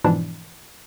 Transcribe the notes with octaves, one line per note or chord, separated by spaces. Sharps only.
G#2 B2 E3 F3 D4